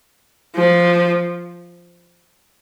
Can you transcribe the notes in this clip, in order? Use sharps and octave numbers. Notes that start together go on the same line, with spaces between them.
F3